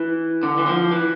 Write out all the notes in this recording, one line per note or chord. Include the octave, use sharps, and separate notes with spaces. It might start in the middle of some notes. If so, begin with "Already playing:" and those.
Already playing: E3
D3
E3
F3
E3